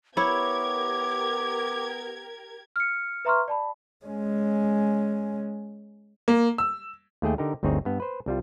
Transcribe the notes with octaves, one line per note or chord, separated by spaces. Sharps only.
B3 E4 G4 A#4 C#5 D6 G#6
F6 C#7
B4 E5 A#5 C6 C#6 F6
D5 A5 B5
G#3 C#4
A#3
E6
D#2 A3 G#4 G5
D3 D#4 G4 A#4
G1 D2 C4 D#4 G#4 C#5
G2 B3
B4 C5
C2 G3 F4